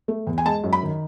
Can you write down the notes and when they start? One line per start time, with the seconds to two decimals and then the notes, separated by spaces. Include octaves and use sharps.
0.08 A3
0.27 E2
0.38 G#5
0.45 G#3 A5
0.64 F#2
0.73 B5
0.83 D#3